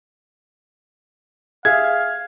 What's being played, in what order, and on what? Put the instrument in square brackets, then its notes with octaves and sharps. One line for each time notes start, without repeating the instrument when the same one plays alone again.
[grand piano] G#4 E5 [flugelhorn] F5 [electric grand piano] G#6